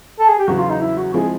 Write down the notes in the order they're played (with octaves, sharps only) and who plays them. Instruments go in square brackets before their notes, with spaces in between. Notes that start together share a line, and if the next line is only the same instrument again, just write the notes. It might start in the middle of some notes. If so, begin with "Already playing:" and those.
[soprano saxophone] A4
G#4
G4
[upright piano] E2 C#3 F#3 [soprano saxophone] F#4
[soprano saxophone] F4
D#4
E4
F#4
[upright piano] F3 G#3 C4 E4 [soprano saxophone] G#4